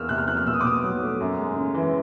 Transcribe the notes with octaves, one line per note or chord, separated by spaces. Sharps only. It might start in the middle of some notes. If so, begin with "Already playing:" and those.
Already playing: E2 A#3 E6 F6
C3 F#6
F6
F3 F#6
F6
B2 E6
D#6
D6
B2 D#6
F#3
A3
F#2
G#3
C#3
E3